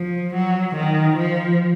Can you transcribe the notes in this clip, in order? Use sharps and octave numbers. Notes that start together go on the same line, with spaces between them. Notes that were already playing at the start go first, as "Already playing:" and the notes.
Already playing: F3
F#3
D#3
F3